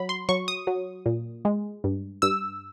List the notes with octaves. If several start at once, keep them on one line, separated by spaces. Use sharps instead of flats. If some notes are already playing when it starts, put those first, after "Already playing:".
Already playing: F#3 B5
C6
F#3 C#6
D#6
F#3
A#2
G#3
G2
G2 E6